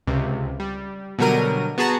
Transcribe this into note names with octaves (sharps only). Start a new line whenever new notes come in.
C#2 C3
G3
B2 D3 F#3 G3 A#4 D#7
B3 F#4 G#4 A5 A#5